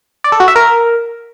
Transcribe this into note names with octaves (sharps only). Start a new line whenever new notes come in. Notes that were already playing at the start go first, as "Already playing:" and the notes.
D5
A4
F#4
E5
A#4